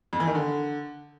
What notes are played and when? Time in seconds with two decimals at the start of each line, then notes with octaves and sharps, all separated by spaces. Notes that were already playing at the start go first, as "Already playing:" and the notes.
0.13 F2
0.20 E3
0.27 D#3
0.35 D3